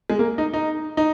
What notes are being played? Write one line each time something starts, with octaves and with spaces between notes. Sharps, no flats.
G#3
A#3
D#4
D#4
D#4